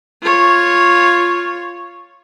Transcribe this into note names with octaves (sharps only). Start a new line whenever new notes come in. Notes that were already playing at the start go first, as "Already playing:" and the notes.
F4 C#5